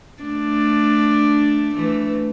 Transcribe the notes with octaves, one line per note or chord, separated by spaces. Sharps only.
A3 D4
E3 A3